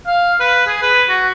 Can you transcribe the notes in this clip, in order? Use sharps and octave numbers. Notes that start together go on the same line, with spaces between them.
F5
B4
G#4
B4
F#4